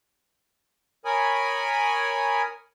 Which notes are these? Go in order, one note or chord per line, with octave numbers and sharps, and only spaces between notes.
A#4 C#5 G#5 B5 D#6